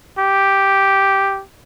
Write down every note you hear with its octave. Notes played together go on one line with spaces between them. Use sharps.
G4